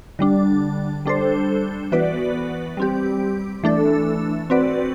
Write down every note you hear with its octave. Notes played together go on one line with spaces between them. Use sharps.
D3 G3 D4
G3 D4 A4 C5
E3 B3 F#4 B4 D5
G3 C4 G4
E3 A3 D4 A4
C4 F#4 B4 D5